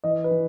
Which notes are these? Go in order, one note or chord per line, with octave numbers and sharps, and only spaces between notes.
E3 D#5
B4
E3